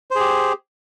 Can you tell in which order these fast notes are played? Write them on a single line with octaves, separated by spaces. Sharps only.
C5 G#4 G4